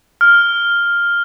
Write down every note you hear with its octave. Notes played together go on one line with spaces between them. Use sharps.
F6